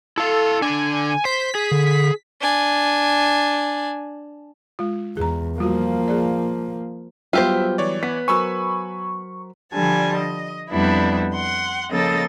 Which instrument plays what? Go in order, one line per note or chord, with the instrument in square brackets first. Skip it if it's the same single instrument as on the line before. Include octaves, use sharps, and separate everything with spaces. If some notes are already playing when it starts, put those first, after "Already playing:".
[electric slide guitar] E4 F5 [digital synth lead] A4
[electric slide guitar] D3 D4 [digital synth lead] G#5
[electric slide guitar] C5 [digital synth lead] B6
[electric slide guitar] G#4
[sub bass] D3
[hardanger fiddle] D4 G#5
[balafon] G#3 F4
[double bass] E2 [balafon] G#4 A#5
[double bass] F3 A#3 [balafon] G3 F4 F#4
[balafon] G#4 D5
[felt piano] F#3 G3 B3 [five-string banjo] F4 G4 C5 [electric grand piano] E5 E6
[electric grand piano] E3 C#5 D5
[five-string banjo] B3 [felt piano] B6
[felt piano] F#3 A#4 C5 [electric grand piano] G#5 B5 E6 [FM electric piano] C#6
[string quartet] D3 F3 G3 G#5 A5
D#5
F2 G3 B3 D4 E4
F#5 C6
C#3 F3 A#3 A4 D#5 A6